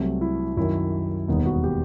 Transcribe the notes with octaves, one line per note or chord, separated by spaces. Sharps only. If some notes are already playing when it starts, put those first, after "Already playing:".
Already playing: C2 C3 F#3 A3 C4
E4
F#2 D#3 F#3 E4
E1 D#2 D#3 G3 B3 D#4
F#4
G4